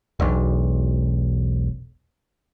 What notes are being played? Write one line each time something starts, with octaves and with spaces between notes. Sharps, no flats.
E1 B1